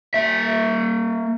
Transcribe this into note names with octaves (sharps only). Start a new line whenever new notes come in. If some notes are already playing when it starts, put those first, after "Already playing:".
A#3 E5